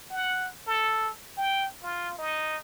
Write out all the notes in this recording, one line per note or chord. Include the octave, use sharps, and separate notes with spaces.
F#5
A4
G5
F4
D#4